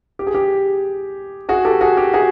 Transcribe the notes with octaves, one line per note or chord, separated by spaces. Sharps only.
G4
G#4
G4
F#4 G#4
G4 A4
F#4 G#4
G4
F#4 G#4